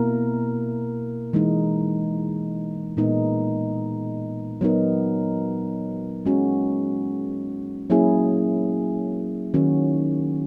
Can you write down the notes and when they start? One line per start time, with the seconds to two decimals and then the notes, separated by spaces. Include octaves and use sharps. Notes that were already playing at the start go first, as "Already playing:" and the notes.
Already playing: B2 A#3 E4 A#4
1.33 E3 G#3 D#4
2.97 A#2 G#3 B3 D#4 A#4
4.61 F#3 B3 D#4 A#4
6.25 G#3 C#4 F#4
7.90 F#3 A#3 C#4 E4 G#4
9.54 D#3 F#3 C#4 F#4